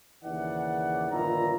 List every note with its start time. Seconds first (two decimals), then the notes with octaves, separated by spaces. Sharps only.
0.24 D#2 C#3 E3 D5 F#5
1.11 G1 A#2 D#3 F3 E4 A#5